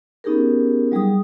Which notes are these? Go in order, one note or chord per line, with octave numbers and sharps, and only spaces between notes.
B3 C#4 D#4 G4 G#4 A#4
F#3 G3 G#4 D#6